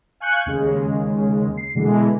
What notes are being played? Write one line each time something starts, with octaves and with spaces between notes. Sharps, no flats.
F5 G#5 C#6 F#6 G6 C#7
D#2 C#3 G#3
C7
B2 D3 E3 G#3